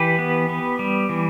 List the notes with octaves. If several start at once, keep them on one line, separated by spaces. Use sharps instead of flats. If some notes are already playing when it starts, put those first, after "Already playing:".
Already playing: E3 G4 B4
B3
B3
G3
E3